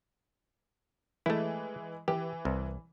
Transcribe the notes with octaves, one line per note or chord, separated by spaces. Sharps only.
E3 G#3 A3 E4
E3 G4
C2